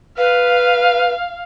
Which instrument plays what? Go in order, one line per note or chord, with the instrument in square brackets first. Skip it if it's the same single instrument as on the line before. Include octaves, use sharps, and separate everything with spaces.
[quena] B4 [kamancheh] F5